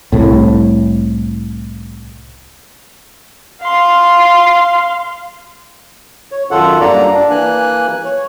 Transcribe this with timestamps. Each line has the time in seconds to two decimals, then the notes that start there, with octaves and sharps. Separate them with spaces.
0.12 C2 A2
3.62 F5 C6
6.31 C#5
6.51 F#2 D#3 F4 A4 F#5
6.81 G2 A#3 D5 A#5
7.14 D4
7.31 E3 A#3 G#5 F#6
8.04 C#5